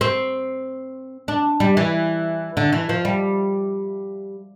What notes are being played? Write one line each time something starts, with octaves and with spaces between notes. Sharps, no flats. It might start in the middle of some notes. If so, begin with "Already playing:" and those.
C4
D4
G3
E3
D3
E3
F3
G3